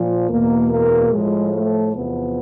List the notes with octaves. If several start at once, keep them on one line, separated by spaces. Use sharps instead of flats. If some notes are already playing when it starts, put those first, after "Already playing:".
Already playing: A#2 F3
E2 B2 A#3
A#3
A2 F3 G#3
A3
E2 C3 F3 B3